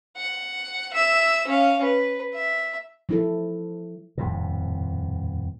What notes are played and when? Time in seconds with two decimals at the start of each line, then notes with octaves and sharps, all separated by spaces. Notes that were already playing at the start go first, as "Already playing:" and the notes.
0.16 F#5
0.93 E5 E6
1.47 C#4 F5
1.83 B4
2.34 E5
3.09 F3 E4 A4
4.18 D#1 F2 A2 C3